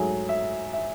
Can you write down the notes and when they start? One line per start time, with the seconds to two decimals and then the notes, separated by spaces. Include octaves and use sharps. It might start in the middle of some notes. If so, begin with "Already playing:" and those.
Already playing: G#2 F#3 A3 G#4
0.29 E5
0.73 E5